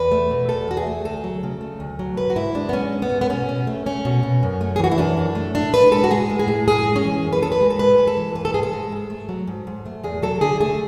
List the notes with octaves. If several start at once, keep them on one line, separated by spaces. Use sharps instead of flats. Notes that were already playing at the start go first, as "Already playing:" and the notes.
Already playing: E2 B4
A3
B2
E2 A4
E2 F#4
G#4
A3
D2 A4
F#3
C#3
A3
D2
F#3
G#2 B4
F#4
G#2 E4
G#3 D4
B3
G#3 C#4
G#2
B3
G#2
B3
B2 C#4
B2
A3
A3 C#4
B2
B2
F#2
A3
G#4
E3 F#4
E4
F#2 D4
F#2
A3
A2 D4
A2 B4
G#3 A4
F#4
G#3 G#4
A2
G#4
A2
F#2 G#4
G#3
C#4
E3
F#2
B4
F#2 A4
B4
G#3
A4
G#2 B4
G#3
A4
E3
G#2 B4
A4
G#2 G#4
A4
G#3
G#2
A3
F#3
G#2
G#2
A3
E2 G#4
F#3 A4
D3 G#4
A3 G#4